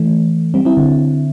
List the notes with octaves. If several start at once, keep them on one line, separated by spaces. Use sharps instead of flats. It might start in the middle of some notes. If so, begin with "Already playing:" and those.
Already playing: E3 A3
G3 C4
C4 E4
D3